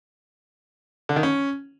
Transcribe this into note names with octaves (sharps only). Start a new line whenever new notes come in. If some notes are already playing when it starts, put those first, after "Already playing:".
D3
D#3
C#4